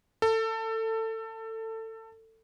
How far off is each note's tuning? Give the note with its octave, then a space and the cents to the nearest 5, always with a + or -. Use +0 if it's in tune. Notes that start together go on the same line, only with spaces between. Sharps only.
A4 +25